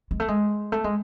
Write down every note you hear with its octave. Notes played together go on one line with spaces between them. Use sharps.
G#3
A3
G#3
A3
G#3